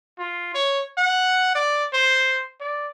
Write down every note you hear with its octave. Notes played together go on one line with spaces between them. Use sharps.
F4
C#5
F#5
D5
C5
D5